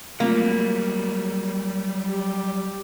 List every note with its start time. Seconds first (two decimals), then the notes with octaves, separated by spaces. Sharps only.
0.20 F#3 G3 A3 A#3 C4 F4
2.06 G4